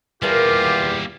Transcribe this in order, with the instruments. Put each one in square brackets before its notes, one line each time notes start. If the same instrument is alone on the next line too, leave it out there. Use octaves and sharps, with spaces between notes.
[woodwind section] E2 G4 [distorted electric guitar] G3 A#3 [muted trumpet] F4 [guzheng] G#4 A#4 E5